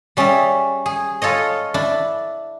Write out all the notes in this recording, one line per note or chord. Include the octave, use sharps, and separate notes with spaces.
G3 C#4 G#4 D5 E5
G#4
F4 A4 C#5 D#5
D4 E4